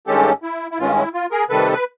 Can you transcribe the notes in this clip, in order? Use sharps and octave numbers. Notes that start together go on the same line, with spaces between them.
G2 D#3 G#3 C#4 G4 A4
E4
E4
G2 D#3 G#3 C#4 F4
E4
F4
G#4 A#4
C3 D#3 G3 A4 B4
B4